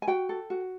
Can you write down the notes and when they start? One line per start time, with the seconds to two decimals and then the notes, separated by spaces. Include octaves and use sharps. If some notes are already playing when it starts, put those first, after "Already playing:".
0.02 G#5
0.07 F#4 G5
0.29 A4
0.50 F#4